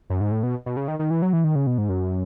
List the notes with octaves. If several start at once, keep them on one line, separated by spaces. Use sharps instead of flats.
F#2
G#2
A2
B2
B2
C#3
D#3
D#3
E3
F#3
E3
D#3
C#3
B2
G#2
F#2